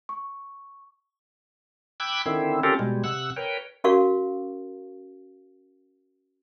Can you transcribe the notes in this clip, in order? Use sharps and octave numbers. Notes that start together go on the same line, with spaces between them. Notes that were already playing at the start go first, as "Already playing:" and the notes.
C#6
G5 B5 D6 E6 F#6 G#6
D3 D#3 C4 E4
C4 C#4 F4 G4 A4 A#4
B2 G3 G#3
C3 F#5 E6 F#6
A#4 B4 C#5 G5
C#4 F#4 A#4 F5 C#6